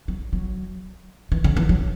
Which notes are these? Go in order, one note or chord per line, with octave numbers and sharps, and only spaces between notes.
F#3
F#3
E3
C#3
E3
F#3